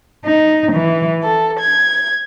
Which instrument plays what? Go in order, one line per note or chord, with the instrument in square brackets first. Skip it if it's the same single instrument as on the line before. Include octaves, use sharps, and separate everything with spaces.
[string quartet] D#4
E3
A4
G#6